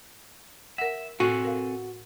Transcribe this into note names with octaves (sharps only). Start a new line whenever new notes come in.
A#4 E5 F#5
A2 C4 F#4 A4 G#5
A#4 F5